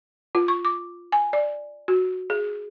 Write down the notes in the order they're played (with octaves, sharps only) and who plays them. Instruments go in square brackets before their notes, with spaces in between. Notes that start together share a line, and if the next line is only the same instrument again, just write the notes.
[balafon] F4
C#6
D6
G#5
D5
F#4
G#4